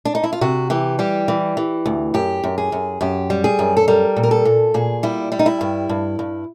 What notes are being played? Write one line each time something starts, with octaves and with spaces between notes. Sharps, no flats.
D4
D#4
E4
F4
C3 F#4
E3 G4
G3 G4
E3
E3
D2
F#2 G4
F#2
G#4
F#2
F#2 G4
G3
G#4
F#2
A4
G3 A#4
A#2
A#4
A4
A#2
A#2 G#4
G3 E4
G3 E4
D#4
E4
G2
G2
G2